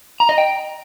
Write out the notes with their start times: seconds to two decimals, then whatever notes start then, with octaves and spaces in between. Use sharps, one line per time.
0.20 A#5
0.29 D#5
0.38 G5